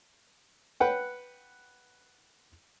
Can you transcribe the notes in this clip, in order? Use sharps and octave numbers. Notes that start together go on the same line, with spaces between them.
B4 F#5 G5